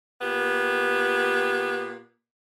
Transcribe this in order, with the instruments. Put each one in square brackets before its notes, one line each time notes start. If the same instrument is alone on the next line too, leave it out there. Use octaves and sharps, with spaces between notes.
[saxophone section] A#2 B3 G4